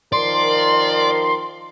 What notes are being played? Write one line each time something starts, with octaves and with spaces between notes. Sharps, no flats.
D#3 F3 A#4 D5 C6